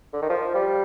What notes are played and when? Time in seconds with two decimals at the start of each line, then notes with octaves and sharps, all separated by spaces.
0.13 D3
0.22 D#3
0.30 F3
0.55 G3